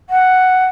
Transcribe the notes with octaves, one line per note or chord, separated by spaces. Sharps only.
F#5